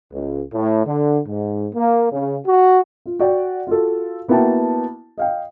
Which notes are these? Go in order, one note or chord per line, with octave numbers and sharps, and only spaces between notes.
C#2
A2
D3
G#2
A#3
C#3
F#4
F4
F#4 D5 F#5 G5
F4 F#4 A4
A#3 B3 E4 F#4 G5 A5
D#5 F5 G5